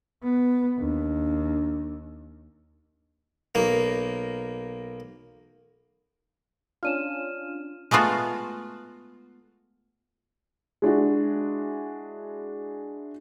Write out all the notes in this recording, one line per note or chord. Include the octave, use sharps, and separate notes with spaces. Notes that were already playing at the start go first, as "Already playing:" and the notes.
B3
D#2 D4
B1 A#3
C#4 D4 F4 F6 D#7 E7
G#3 A3 B3 F4 F#4
G#3 D4 E4 F#4